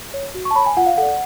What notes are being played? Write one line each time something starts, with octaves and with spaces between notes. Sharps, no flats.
C#5
F#4
C#6
A5
C#5 B5
G#5
F4 F#5
F5
A4 D5 F#5